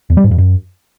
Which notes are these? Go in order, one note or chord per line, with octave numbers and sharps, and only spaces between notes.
E2
G3
G#2
F2
F#2